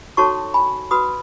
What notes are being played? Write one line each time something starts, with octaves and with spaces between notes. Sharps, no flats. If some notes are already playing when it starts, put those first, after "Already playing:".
D#4 F#4 A4 C#5 A5 C#6
G#5 B5
F#4 B4 B5 D#6